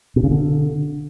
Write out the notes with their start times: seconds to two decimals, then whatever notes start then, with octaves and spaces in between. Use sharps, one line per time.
0.16 B2
0.24 C#3
0.31 D3